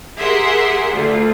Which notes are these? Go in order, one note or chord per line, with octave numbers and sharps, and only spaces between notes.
G4 G#4 A#4 E5 F#5 C6
D2 F4